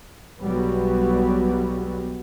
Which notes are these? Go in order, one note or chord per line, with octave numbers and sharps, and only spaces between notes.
B1 F#3 G3 B3